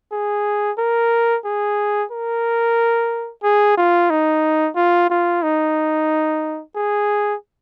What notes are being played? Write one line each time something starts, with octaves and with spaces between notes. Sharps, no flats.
G#4
A#4
G#4
A#4
G#4
F4
D#4
F4
F4
D#4
G#4